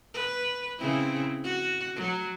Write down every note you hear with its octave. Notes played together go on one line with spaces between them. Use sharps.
B4
C#3 C4 E4
F#4
F#3